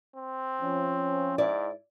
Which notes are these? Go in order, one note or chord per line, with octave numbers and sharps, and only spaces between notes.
C4
F3 C#4
G#2 E4 D5